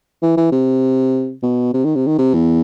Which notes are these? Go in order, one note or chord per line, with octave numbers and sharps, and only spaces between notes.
E3
E3
C3
B2
C3
D#3
C3
D#3
C3
E2